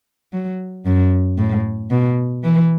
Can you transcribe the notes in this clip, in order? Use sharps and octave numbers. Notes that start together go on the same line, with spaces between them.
F#3
F#2
A2
B2
E3